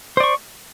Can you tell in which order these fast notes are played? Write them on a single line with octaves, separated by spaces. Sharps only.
C5 D5 C#6